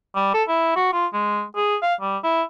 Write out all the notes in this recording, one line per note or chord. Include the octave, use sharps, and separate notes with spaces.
G3
A4
E4
F#4
F4
G#3
G#4
F5
G3
E4